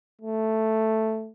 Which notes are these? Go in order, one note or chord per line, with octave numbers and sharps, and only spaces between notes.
A3